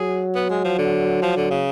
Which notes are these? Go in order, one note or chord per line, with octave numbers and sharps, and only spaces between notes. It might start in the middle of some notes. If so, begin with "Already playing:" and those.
Already playing: F#3 G#4
B3
G#3
F3
D3
F3
D3
C#3